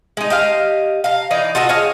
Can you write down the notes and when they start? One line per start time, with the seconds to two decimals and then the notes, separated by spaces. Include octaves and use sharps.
0.17 G#3 D#4
0.30 G4 D#5 F5
1.04 F5 A#5
1.31 E3 D#4 D5
1.55 F4 F#4 A4 D#5
1.69 G#4 C#5 F5